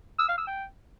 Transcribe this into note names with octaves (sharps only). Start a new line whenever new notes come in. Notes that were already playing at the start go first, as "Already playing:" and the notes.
E6
F5
E6
G5